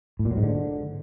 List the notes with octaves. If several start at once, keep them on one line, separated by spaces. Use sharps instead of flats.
A2
A#2
F#3
G#2
D3